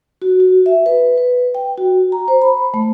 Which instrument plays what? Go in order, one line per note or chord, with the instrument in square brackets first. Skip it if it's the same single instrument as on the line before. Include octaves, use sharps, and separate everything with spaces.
[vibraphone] F#4
F#4
E5
B4
B4
G5
F#4
A#5
C5
B5
A3